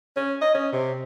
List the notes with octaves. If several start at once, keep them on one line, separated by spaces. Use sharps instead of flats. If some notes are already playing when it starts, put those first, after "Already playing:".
C#4
D#5
C#4
C3